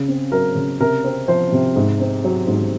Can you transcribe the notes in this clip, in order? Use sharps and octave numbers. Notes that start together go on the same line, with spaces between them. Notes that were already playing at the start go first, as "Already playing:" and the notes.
Already playing: C#3
C4
F#3 A#4
C#3
C3 A#4
C4
F3 C5
C3
G#2
C4
F#3
G#2